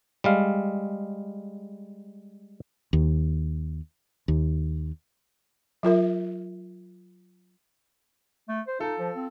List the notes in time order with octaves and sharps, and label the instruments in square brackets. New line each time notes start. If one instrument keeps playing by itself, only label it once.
[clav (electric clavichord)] G3 G#3 F5
[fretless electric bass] D#2
D#2
[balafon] F#3 F4 A#4 E5
[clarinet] A3
C5
[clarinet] D#4 [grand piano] F4 A4
[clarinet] F3
C4